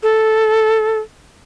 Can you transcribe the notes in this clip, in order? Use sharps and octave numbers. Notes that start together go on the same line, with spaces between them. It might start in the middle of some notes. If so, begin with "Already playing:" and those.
A4